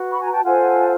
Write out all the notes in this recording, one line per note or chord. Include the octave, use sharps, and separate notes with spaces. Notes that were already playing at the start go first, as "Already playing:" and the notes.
Already playing: F#4 B4
B5 C#6
G#5 A#5
G5 A5
F4 A4 C5 F#5 G#5